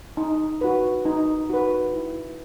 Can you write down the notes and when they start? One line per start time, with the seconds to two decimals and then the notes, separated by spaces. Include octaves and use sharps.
0.17 D#4
0.61 F#4 B4
1.05 D#4
1.50 F#4 B4
1.93 E4